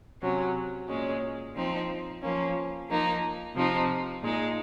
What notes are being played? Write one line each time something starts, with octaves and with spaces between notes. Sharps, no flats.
C3 F#3 C#4
A#2 G#3 C#4
F3 C4 D#4
F3 A#3 C#4
F3 A#3 D#4
C3 F3 C4 D#4
A#2 G#3 D#4